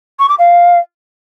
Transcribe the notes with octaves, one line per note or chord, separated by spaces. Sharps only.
C#6
D6
F5